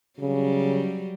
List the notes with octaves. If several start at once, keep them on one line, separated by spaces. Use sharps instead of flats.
C#3 F#3 G3